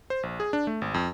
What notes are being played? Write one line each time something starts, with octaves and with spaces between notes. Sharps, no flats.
C5
A#1
G#4
D4
A3
G#1
F2